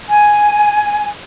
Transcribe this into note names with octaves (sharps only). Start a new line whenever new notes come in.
G#5